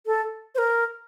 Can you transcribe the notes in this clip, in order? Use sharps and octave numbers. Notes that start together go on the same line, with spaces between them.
A4
C5
A#4